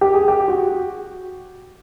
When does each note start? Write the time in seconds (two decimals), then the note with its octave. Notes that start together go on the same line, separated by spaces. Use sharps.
0.01 G4
0.14 G#4
0.28 G4
0.48 F#4